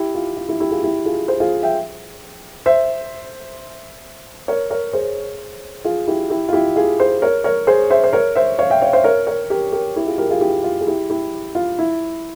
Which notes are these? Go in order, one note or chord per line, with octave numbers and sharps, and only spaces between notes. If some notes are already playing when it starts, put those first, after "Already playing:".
Already playing: E4 G4
F4
F4
E4 G4
E4 G4
F4 G#4
E4 G4
F4 G#4
G#4 C5
F4 G#4
E5 G5
C5 E5
A#4 C#5
A#4 C#5
G#4 C5
F4 G#4
E4 G4
E4 G4
F4
E4 G4
F4 G#4
G#4 C5
A#4 C#5
A#4 C#5
G#4 C5
C5 E5
C5
A#4 C#5
C5 E5
C#5 F5
E5 G5
C#5 F5
C5 E5
A#4 C#5
A#4 C#5
G4 A#4
G4 A#4
E4 G4
F4 G#4
G4 A#4
F4 G#4
E4 G4
F4
G#4
E4 G4
E4 G4
F4
E4